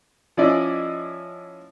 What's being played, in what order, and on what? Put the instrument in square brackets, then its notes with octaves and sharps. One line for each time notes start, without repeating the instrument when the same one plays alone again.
[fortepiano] F3 C#4 E4 D5 D#5